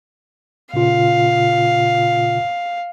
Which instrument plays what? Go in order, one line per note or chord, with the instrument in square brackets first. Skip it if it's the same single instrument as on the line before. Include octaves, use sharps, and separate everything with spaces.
[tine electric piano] A#2 C#3 F4 [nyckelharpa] F5